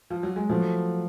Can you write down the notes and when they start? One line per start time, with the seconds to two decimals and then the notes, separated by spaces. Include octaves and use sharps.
0.10 F3
0.23 F#3
0.36 G#3
0.49 F3 F#3 A3